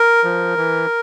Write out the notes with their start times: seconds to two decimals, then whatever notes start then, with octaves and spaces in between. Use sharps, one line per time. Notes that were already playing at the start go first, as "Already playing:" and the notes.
Already playing: A#4
0.24 F3
0.57 E3